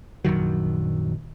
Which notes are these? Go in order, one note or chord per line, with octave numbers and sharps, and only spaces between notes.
A#1 F#2 D#3 F#3